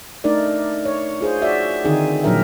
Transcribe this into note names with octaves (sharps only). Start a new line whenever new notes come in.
A3 D4 D#4 A#4 D5
C#5
F4 G#4 C5
F#4 D5 E5
D3 D#3 C4 D#4 G#4
A#2 F3 F#3 D4 A#4 E5